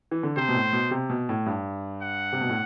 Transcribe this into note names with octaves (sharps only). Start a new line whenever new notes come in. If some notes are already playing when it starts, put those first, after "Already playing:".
E3
D3
C3 C5
B2
A2
B2
C3
B2
A2
G2
F#5
C3
B2
A2